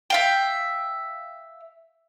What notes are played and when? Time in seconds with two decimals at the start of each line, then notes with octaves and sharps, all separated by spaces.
0.10 E5 F5 G5